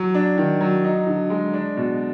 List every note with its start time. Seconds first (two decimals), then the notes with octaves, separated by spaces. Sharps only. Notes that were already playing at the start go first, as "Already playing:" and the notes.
Already playing: F#3
0.14 D4
0.37 D#3
0.61 F#3
0.84 D#4
1.07 D3
1.30 G#3
1.53 D4
1.77 B2